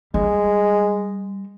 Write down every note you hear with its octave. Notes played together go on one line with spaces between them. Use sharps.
G3 G#3